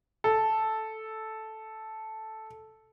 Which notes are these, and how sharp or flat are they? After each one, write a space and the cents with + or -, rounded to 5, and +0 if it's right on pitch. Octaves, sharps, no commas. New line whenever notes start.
A4 -5